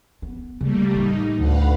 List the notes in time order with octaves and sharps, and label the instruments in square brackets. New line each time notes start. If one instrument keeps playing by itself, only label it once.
[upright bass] B3
[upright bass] C#3 [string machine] G3 A3 A#3
[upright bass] A2 E3 [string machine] D#4
[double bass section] D2 [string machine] B4 F5 F#5